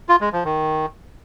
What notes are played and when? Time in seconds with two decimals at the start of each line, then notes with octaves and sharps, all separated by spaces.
0.09 F4
0.21 G#3
0.33 F3
0.45 D#3